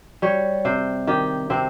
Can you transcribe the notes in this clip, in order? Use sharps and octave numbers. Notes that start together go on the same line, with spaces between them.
G3 C#5
C3 C5
D#3 G4
C3 C4